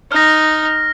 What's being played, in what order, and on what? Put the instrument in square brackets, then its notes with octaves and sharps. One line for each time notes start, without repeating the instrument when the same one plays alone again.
[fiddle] D#4 [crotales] F6 A#6